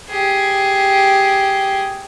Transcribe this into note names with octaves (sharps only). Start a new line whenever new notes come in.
G4 G#4